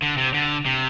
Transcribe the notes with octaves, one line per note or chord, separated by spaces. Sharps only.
D3
C3
D3
C3